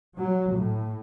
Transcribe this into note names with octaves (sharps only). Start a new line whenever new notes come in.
F#3
A2